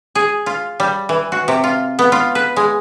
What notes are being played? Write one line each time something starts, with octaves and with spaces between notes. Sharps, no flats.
G#4
F4
G3
E3
F#4
C3
F4
B3
F4
B4
G#3